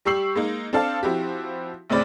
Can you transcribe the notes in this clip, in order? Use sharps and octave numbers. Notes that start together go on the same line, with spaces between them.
G3 G4 C#6 E6 C7 F#7
G#3 A#3 D#4
C4 D4 A4 F5 A5
F3 C4 E4 F#4 G4
A1 D2 C#3 C4 D5 B5